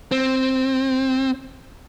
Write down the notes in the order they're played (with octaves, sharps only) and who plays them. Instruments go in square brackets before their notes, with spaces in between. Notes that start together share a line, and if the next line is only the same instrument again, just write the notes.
[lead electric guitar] C4